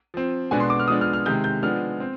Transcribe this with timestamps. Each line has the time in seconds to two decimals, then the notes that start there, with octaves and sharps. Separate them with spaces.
0.14 F3 C4
0.51 B2 G#3 B3 D4 G#5
0.60 C6
0.70 D6
0.79 F6
0.88 F3 G#3 B3 D4 D#6
1.01 F6
1.13 F6
1.25 C3 D#3 G#3 G6
1.44 G6
1.63 F3 G#3 B3 D4 F6
2.00 C4